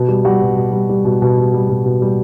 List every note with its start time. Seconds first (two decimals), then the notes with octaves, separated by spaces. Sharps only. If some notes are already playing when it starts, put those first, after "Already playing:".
Already playing: B2
0.08 G3
0.25 G3 F#4
0.41 B2
0.56 B2
0.73 G3
0.89 G3
1.05 B2
1.22 B2
1.38 G3
1.54 G3
1.69 B2
1.86 B2
2.02 G3